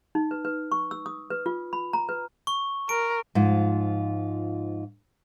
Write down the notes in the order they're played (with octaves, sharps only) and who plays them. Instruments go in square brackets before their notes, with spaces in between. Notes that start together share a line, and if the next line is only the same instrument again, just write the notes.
[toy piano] D#4
B4
B4
C#6
E6
D#6
B4
F4
B5
A#5
B4
[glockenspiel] C#6
[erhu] A#4 [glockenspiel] D7
[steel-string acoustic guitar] G#2 F3 F4